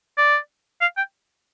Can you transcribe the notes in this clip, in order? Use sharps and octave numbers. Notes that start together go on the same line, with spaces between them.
D5
F5
G5